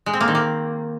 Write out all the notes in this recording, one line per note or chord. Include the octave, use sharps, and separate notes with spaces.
G#3
C4
A#3
D#3
A#3